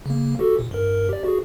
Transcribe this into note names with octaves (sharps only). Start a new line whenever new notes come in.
C#3 A#3
F#4 G4 A4
A#2
G2 A#4
G4 D5
F#4 G#4